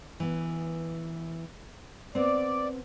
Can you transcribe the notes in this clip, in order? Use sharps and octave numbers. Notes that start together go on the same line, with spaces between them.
E3 B3
B3 C4 D5